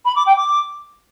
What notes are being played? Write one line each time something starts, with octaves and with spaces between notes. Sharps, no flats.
B5
D6
G5
D6